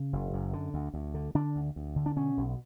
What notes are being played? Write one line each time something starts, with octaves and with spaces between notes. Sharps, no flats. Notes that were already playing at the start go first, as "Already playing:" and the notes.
Already playing: C#3
F#1
F#2
D3
D2
D2
D3
D3 D4
D2
D2
D3
D4
B2 C#4
B1